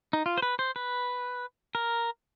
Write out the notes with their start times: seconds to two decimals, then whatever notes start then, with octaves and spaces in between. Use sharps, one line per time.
0.13 D#4
0.26 F4
0.38 C5
0.42 B4
0.59 C5
0.76 B4
1.75 A#4